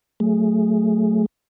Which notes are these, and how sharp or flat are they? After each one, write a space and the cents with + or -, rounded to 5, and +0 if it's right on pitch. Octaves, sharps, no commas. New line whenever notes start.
F#3 -10 A3 +0 G#4 +0